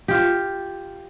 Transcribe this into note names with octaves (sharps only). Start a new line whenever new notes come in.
F4 G4